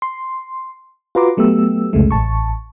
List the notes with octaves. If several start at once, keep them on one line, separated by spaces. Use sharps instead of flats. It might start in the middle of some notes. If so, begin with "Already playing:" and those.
C6
F4 F#4 B4 A#5 C6 D6
F#3 A3 B3 G4 E6
C2 F2 C#3 G#3 A3
A1 A5 C#6